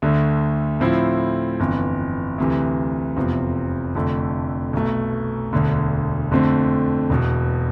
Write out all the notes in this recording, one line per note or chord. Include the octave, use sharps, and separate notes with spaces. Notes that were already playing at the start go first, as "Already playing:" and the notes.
D2 D3 A3
A2 F3 C4 E4
G1 F2 E3
D2 C3 E3
F1 E2 C3 F3 C4
F1 F2 D3 A3
B1 B2 A3
E1 D2 D3
F2 D3 A3 C4
E1 E2 B2